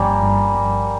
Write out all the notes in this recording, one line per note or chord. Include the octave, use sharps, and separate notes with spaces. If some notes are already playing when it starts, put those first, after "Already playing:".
Already playing: G1 G2 F3 G3 A#3 C#4
G2
G2